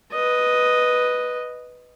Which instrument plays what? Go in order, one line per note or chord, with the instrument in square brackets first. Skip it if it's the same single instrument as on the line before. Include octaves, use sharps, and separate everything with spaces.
[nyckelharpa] B4 D#5